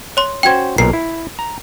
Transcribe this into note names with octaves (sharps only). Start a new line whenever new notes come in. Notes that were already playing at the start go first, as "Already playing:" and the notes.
C#5 C6
C#4 F#4 C5 G5 G#6
B1 A#2 A#4 C7
E4
A#5